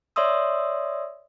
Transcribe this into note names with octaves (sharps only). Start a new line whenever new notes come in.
C#5 D5 E5 C6 D#6 E6